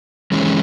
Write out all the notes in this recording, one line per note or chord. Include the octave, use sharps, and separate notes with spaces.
E3 G#3 C#4